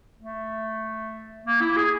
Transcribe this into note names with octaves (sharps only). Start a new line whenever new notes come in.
A3
A#3
E4
G#4